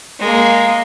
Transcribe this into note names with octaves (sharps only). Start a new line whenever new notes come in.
G#3 A#3